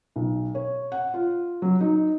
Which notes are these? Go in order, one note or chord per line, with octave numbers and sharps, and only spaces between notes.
B1
C#5
F#5
F4
F#3
D#4